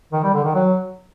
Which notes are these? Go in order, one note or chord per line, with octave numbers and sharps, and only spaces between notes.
D#3
G3
D3
D#3
F#3